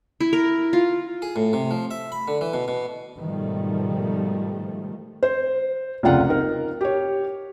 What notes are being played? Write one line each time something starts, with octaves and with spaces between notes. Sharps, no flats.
E4
A#4
F4
G#4
A2
C3
F3
E5
B5
D3
E3
B2
B2
G#2 B2 D#3 F3 G3 A3
C5
F1 C#2 F4 F#5
D#4 A#4
G4 C#5